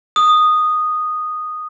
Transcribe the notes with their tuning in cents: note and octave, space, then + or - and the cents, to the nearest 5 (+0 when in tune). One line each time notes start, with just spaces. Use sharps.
D#6 -10